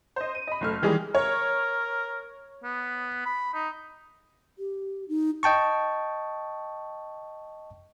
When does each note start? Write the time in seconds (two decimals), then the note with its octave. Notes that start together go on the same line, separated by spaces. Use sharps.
0.16 C5 D#5
0.35 D#7
0.47 D#5 B5
0.61 F#1 A3 F6
0.82 D#3 E3 G3 G#3 G#4
1.15 A#4 C#5
2.64 B3
3.26 B5
3.54 D#4
4.59 G4
5.09 D#4
5.43 D#5 G5 A5 C#6